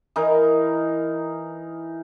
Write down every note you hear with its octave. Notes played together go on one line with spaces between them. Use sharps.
E3 D#4 A#4